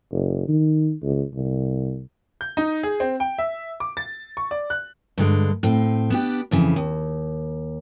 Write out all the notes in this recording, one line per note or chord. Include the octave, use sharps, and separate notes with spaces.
F#1
D#3
C#2
C2
G6
D#4
G#4
C4
G5
E5
D6
A6
C#6
D5
F#6
G2 D3 G#3
A2 C4
B3 D4 G4
F2 C#3 E3
D#2